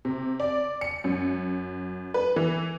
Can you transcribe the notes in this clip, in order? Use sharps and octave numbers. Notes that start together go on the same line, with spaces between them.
C3
D5
C#7
F#2
B4
E3